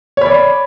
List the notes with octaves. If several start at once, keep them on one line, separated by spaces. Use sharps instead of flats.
C#5 D5 B5